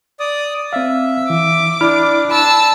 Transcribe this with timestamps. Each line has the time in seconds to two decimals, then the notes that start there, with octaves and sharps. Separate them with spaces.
0.20 D5 D#6
0.73 C4 E5 F5
1.30 E3 D6
1.81 D4 E4 B5 F6
2.31 A5 B5 E6